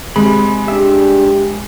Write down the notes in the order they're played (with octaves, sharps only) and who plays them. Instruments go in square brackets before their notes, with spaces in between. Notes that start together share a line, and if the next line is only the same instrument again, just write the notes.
[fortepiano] C3 [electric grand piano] G#3 [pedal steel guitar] B5
[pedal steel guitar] D4 E5 [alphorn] G4